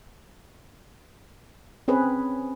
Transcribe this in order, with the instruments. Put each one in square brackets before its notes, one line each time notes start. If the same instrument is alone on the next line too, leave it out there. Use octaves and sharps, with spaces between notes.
[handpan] C4 C#4 G#4 B4